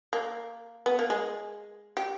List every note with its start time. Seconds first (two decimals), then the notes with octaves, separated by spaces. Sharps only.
0.13 A#3
0.86 B3
0.99 A#3
1.10 G#3
1.97 G4